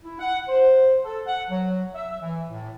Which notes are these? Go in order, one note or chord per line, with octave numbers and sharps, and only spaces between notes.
E4
F#5
C5
A4
F#5
F#3
E5
E3
A2